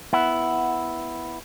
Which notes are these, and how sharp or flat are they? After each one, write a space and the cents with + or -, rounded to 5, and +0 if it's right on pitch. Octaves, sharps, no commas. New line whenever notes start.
B3 +0 E4 +0 F#5 +5